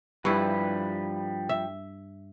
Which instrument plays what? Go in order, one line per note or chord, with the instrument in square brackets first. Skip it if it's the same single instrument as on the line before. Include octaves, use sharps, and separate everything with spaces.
[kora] G2 E4 [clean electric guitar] F3 G3 B4
[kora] E5